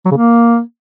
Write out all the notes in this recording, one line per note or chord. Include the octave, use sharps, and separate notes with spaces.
F#3
C#3
A#3